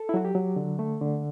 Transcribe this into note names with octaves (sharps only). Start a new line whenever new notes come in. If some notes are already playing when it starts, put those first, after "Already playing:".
Already playing: A4
E4
F#3 F#4
G4
F#3
D3
A3
D3